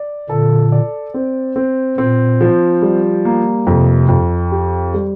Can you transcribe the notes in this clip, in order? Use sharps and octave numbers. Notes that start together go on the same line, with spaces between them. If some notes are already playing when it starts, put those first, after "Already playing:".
Already playing: D5
A#2 D3 A4
D5
C4
C4
A#2 C4
F3
G3
A#3
F2 C3
F2
G4
G3